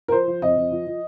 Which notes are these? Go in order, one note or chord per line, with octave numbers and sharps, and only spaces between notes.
A#4
F3 C5
F3
F2 D#5
F2
F3
F3